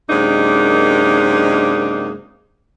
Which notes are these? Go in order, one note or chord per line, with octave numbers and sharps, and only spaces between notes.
F#2 C3 G#3 A#3 D4 D#4